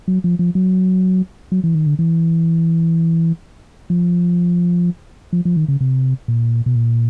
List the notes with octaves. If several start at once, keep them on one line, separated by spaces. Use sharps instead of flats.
F#3
F3
F3
F#3
F#3
E3
D#3
D3
E3
F3
F3
F3
D#3
C#3
C3
A#2
B2
A#2